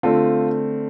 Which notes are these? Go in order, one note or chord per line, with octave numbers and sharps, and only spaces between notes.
D3 A3 C4 F4